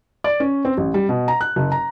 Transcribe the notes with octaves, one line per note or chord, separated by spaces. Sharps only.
D5
C#4
C4
A1
G3
B2
A#5
F#6
F#1
A#5